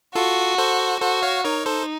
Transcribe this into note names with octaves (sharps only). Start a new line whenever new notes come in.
F4 F#4 A4
A4 C5
F#4 A4 C5
C#5 F5
D#4 A#4 C#5
A4 C5